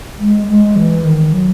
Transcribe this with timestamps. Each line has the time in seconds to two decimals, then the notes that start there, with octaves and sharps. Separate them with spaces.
0.19 G#3
0.47 G#3
0.76 E3
1.04 D#3
1.33 F#3